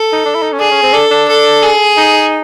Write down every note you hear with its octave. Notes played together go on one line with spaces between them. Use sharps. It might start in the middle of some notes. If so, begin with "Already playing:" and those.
Already playing: A4
D#4
D4
E4
D#4
C#4
D4 G#4
C#4
C4
D4 A4
D4
A4
G#4
D#4